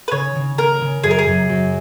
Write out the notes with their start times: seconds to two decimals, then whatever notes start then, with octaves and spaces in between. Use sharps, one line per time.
0.08 B4
0.11 C#3 C#5
0.35 C#3
0.58 A#3 A#4
0.81 C#3
1.03 F#2 G#4
1.11 A#4
1.19 G#4
1.27 F#2
1.49 F#2